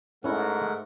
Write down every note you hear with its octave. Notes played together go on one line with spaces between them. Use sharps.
G#2 A3 C#4 E4 A#4 C#5 F#5